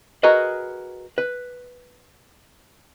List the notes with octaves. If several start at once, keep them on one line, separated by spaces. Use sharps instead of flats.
F#4 G#4 A#4 B4 D#5
B4